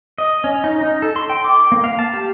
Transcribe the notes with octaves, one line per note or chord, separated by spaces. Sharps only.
D#5
C#4
D#4
D#4
A4
C6
G5
D6
A#3
F5
A5
G4